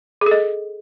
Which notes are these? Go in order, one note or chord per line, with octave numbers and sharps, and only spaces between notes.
G#4 A4 D#5